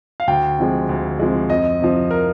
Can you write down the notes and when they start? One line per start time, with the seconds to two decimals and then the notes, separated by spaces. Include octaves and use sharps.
0.20 F5
0.27 D2 G5
0.59 C3 F3 G#3
0.89 D2
1.19 C3 F3 G#3
1.50 F2 D#5
1.80 C3 F3
2.11 A#4